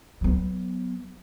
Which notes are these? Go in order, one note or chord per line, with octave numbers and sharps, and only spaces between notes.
F#3 B3